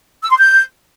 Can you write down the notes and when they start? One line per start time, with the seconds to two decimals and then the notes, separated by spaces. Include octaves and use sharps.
0.22 E6
0.30 C6
0.38 G6